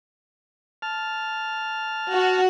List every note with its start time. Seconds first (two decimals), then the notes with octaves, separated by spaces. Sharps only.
0.82 A5 F6
2.12 F#4